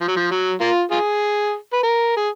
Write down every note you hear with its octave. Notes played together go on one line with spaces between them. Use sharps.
F3
F#3
F3
F#3
A#3 F4
F4 G#4
B4
A#4
G#4